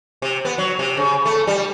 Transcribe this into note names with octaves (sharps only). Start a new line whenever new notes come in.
C3
B3
F#3
C3
C#3
A3
G3